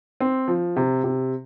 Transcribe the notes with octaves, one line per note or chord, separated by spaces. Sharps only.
C4
F3
C3
C3